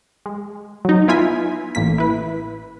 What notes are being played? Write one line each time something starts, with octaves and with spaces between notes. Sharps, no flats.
G#3
F#3 D#4
B3 E4 F4 G#5 B6
A1 A#3 B6
E4 B4